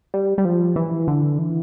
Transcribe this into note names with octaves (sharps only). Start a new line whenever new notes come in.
G3
G3
F3
E3
D3
E3